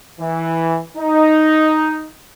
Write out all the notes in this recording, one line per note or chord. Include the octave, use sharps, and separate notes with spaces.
E3
D#4